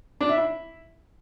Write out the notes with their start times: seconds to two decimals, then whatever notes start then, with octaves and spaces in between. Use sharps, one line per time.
0.21 D4
0.29 E5
0.37 E4